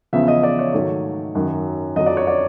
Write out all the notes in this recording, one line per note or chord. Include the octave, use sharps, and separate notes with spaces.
E2 C#3 F3 E5
D#5
D5
C#5
G#2 D#3 F#3 A3
F#2 D#3 F#3
F2 D3 F#3 D#5
D5
C#5
D5